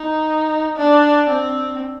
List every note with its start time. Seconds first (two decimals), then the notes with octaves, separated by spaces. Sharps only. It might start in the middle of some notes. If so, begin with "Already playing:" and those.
Already playing: D#4
0.76 D4
1.30 C4